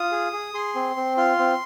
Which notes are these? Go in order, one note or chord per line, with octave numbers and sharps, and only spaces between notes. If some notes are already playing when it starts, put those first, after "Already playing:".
Already playing: F4 D#6
G#4
G#4
G#4 C6
C4
C4
F4 C6
C4